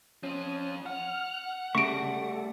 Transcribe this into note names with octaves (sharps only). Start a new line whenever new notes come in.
F3 C4 C#4 D#6
F#5 F6
C#3 G3 A3 C#6 A#6 D7
A4